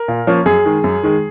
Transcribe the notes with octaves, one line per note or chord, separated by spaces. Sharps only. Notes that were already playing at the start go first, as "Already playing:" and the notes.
Already playing: A#4
A#2
F3 A#3 C#4
F#2 G#4
D#3 G#3
F#2
D#3 G#3